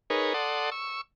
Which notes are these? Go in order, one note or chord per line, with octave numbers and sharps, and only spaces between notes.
D#4 G#4 A#4 B4 C#5
A4 D5 F#5 C6 D#6
C#6 E6